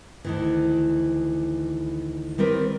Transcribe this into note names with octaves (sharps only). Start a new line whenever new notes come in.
D2 D#3 E3
D#3 G3 C4 A#4 B4